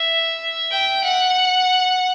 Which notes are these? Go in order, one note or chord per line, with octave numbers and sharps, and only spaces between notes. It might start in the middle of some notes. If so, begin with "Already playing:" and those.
Already playing: E5
G5
F#5